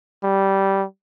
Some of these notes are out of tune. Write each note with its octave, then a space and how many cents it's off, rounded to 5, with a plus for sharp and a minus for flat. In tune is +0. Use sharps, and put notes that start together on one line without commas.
G3 -10